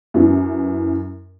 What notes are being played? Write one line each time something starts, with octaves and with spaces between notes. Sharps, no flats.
F#2 E3